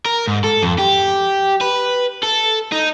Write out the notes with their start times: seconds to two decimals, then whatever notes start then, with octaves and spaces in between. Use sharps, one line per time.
0.05 A#4
0.27 G#2
0.44 A4
0.63 F2
0.78 G4
1.61 B4
2.23 A4
2.72 D#4